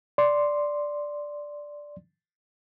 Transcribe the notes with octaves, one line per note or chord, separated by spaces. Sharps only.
D5 C6